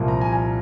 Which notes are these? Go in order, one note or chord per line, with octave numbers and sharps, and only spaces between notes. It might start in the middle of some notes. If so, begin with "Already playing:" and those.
Already playing: C2 A#2 F3 A#3
A#5
G#5
A#5